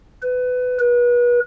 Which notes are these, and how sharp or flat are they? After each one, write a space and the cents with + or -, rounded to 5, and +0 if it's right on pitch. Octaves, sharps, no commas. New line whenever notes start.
B4 +20
B4 -35